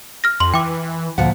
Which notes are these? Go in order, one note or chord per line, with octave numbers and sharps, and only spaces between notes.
F6 A#6
F2 C6 F#7
E3 G5 D6
D2 A#2 F3 F#5